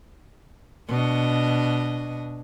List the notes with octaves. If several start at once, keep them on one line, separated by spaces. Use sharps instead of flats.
B2 D4 D#5